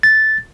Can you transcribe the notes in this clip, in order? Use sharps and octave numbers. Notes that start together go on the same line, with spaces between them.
A6